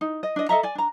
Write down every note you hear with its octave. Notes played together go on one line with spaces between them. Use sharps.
D#4
D#5
D4 D#5
A4 D#5 E5 A#5
D5 G#5
D4 A#5